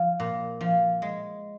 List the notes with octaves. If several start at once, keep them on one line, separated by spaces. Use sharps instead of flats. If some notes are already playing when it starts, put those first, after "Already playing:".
Already playing: F3
A#2
F3
G#3